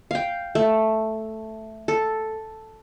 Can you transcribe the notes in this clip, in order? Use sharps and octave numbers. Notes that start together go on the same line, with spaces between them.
F5 G5
A3
A4